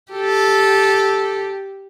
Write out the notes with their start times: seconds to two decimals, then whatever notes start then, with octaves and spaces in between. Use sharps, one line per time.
0.12 G4 A4